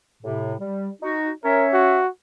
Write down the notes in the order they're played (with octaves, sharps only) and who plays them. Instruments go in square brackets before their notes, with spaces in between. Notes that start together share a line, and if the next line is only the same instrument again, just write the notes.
[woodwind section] A2 C3
G3
D#4 F#4
[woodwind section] C#4 C#5 E5 [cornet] A#4
[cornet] F#4